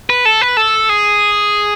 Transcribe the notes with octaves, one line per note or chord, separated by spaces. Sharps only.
B4
A4
B4
A4
G#4